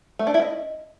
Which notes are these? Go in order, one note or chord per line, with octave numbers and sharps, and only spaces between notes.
A3
D4
E4
D#5